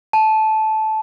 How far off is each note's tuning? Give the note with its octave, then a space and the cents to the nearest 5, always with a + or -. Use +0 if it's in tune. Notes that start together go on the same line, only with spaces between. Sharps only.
A5 -15